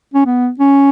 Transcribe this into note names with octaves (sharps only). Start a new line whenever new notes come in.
C#4
B3
C#4